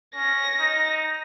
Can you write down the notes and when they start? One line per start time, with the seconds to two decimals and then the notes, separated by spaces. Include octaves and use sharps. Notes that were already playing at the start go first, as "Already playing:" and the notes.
0.15 C#4 A#6
0.60 D#4